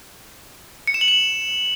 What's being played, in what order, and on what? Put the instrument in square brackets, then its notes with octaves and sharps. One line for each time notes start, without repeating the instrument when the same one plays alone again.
[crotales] C#7
E7
F#7
E7